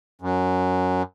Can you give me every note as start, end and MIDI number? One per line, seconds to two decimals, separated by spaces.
0.21 1.02 42